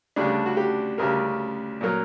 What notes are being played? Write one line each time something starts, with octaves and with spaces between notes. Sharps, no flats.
D2 C#3 G3 D4
F#4
G4
D2 C#3 G3 A#4
A#2 F#3 A#3